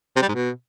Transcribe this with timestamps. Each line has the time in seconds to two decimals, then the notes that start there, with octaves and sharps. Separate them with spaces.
0.16 C3
0.22 G3
0.28 G#2
0.34 B2